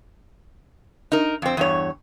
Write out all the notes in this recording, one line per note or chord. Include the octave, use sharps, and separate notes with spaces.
D#4 A#4
F2 C4
E2 G2 C#5